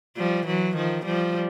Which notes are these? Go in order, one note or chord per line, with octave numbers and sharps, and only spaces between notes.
F3 G3
E3 F#3
D#3 F3
F3 G3